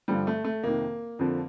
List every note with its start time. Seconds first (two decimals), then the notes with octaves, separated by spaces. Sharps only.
0.08 G2 D3 F3 G3
0.27 A3
0.44 A3
0.63 F2 C3 D#3 A#3
1.19 F2 D3 F3